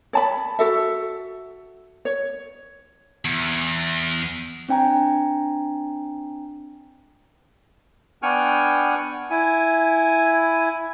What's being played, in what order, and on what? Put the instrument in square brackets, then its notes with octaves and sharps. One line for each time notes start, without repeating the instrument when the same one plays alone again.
[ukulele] C#5 A5 B5
F#4 A4 E5
C#5
[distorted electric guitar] E2
[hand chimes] C4 D4 G5 G#5 A#5
[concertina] B3 D4 G5 G#5 C#6 F6
E4 G#5